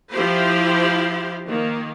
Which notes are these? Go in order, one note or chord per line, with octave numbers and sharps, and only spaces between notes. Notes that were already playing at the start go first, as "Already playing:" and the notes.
F3 E4 G4 C5
D#3 A#3